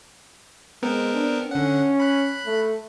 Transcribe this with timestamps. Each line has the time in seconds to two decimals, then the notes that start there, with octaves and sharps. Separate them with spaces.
0.83 G#3 B3 C4 A#4
1.14 D4
1.51 D3 C#4 F#5
2.00 B5 F#6
2.46 A3